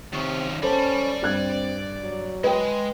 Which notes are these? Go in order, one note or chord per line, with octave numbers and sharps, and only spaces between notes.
C3 D#3 C#4
C#4 A4 C5 D5 A5 B5
G2 C4 F#6 G#6
F#3
G#3 B4 G5